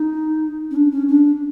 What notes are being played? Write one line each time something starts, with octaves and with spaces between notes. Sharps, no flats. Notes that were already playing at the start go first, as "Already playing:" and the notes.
Already playing: D#4
C#4
D4
C#4
D4